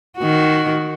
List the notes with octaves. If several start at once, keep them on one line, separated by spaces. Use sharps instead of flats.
D#3 F#4